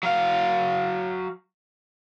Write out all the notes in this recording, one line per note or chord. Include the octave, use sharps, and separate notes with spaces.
F#3 F5